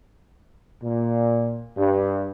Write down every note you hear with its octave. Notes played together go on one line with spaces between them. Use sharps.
A#2
G2